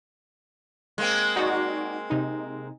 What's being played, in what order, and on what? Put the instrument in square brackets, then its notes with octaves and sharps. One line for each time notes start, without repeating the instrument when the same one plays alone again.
[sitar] G#3 A#3 C4
[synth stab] D#4 F#4 D5
C3 D#4